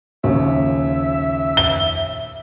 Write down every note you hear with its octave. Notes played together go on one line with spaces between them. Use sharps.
A#1 D#2 C#3 E5
G7